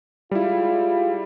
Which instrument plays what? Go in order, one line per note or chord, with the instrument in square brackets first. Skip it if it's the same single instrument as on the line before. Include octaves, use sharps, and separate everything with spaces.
[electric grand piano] G3 E4 [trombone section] G#3 F4